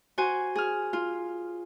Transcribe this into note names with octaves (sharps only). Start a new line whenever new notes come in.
F#4 C5 G#5
G#4 F6
F4